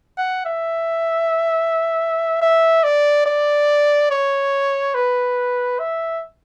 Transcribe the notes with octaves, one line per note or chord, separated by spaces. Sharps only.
F#5
E5
E5
D5
D5
C#5
B4
E5